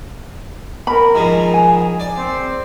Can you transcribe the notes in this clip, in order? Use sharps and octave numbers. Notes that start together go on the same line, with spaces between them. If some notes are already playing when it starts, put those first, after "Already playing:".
A#4 B5
G#2 D#3 F3 G#4
G#5
D5
C4